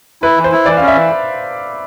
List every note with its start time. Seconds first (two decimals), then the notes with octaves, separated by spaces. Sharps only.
0.22 E4 B4
0.38 E3
0.44 C5
0.52 E4
0.66 E3 D5
0.77 C#4 F5
0.88 E5
0.94 E3